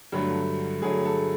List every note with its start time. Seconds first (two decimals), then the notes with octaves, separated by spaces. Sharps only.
0.12 G2 D3 F#3 A3
0.82 G2 D3 F#3 A3 G#4
1.05 A4